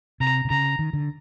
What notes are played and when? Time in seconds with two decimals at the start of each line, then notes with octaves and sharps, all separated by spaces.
0.20 C3 A#5
0.45 C3
0.50 C#3 A#5
0.79 D#3
0.93 D3